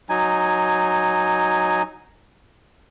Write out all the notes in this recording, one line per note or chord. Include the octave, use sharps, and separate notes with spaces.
F#3 D#4 G#5